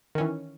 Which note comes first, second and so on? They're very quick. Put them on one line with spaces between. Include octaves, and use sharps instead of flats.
D#3 C#4 E3